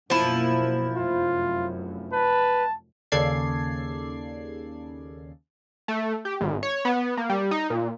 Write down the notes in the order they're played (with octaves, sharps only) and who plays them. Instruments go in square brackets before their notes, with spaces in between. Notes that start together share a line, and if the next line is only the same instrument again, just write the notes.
[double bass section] F#2 B2 A#3 [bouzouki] F3 E4
[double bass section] F1 F#2 [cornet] F4
[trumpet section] B4 [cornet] A5
[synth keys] D#2 C#3 A4 D5 G#6 C7
[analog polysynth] A3
G4
G#1
C#5
B3
A#3
G3
D#4
A#2